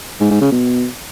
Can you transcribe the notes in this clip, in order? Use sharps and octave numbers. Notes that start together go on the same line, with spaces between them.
G#2
G#2
C#3
B2